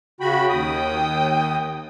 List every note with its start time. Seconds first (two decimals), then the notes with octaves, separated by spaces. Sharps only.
0.20 C#3 F#4 G5 B5
0.49 D#2 D#6